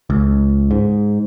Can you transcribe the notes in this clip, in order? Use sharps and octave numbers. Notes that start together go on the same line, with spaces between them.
C#2
G#2